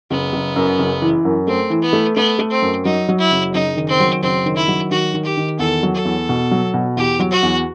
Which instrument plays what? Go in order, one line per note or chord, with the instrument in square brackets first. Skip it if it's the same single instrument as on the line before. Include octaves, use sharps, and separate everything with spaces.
[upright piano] F#1 [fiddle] B3
[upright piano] F#1
F#2
F#1
E3
F#2
[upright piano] A3 [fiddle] C4
[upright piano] E3
[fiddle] B3
[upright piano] A3
[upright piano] A3 [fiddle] B3
[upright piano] A3
[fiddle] C4
[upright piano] F#2
[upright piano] F#3 [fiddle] D#4
[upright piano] F#3
[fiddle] E4
[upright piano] F#1
[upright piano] F#1 [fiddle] D#4
[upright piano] D#3
[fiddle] C4
[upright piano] F#3
[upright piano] F#1 [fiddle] C4
[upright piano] D#3
[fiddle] E4
[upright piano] F#3
[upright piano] D#3 [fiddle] F#4
[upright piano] D#3
[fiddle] G4
[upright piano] D#3
[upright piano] E2 [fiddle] A4
[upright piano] F#3
[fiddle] A4
[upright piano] E2
B2
F#3
B2
[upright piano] E2 [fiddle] G4
[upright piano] F#3
[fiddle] F#4
[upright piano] E2